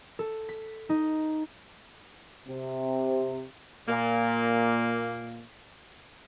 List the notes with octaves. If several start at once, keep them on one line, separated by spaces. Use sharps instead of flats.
A4
B6
D#4
C3
A#2 A#3